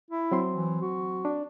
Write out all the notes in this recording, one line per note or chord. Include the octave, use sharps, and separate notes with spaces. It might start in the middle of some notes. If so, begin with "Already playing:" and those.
E4
F#3 C4 C6
E3
F#4
D4